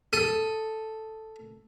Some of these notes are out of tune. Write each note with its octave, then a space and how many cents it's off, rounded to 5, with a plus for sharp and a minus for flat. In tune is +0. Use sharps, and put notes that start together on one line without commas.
A4 +0 D#6 +10